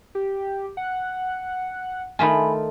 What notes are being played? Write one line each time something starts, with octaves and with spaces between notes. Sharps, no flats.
G4
F#5
D#3 A3 F4 G#5 B5